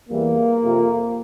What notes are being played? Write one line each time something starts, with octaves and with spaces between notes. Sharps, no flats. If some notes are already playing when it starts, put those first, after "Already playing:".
E2 E3 G3 A#3
F2 C3 F3